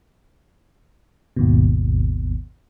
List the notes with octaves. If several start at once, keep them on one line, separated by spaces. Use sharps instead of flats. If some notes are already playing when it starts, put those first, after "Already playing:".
G#1 D#2 B2